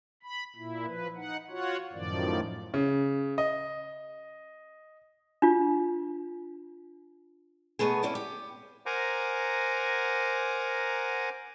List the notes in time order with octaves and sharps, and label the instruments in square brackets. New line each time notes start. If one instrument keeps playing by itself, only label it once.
[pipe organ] B5
A#2 E4
F3 B4
D#4 F#5
F4 F#4 C#5 F#5
F#2 A2 D#3 F3 D5
[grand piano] C#3
D#5
[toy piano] D4 F4
[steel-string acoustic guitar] B2 A3 B3 G#4
C4 C#4 E4 D5
G4
[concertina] A#4 C5 F#5 G#5 A#5 D6